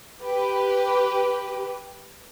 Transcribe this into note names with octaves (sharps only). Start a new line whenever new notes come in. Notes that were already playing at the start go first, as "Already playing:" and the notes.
G4 B4